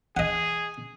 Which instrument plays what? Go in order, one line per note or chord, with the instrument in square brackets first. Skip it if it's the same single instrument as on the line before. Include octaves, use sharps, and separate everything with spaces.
[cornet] G#4 [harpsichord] D#5 F#5